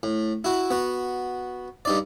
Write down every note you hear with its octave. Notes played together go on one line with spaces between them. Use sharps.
A2
E4 F#4
B3 F#4
G2 D#4 D5